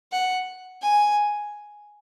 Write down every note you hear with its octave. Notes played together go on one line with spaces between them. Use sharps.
F#5
G#5